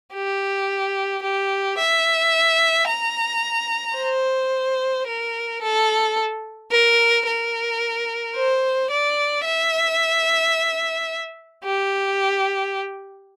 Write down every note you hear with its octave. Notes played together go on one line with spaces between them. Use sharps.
G4
G4
E5
A#5
C5
A#4
A4
A#4
A#4
C5
D5
E5
G4